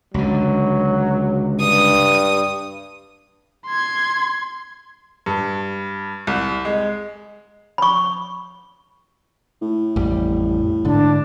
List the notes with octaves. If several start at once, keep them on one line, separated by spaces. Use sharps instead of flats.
C#2 D3 F#3
G2 D#6
C6 G#6
G2
C2
G#3
B5 C#6
A2
A1 F2 G3
G#2 D3 D4